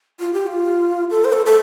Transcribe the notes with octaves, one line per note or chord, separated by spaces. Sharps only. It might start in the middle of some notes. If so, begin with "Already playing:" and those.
F4
G4
F4
A4
C5
A4
A4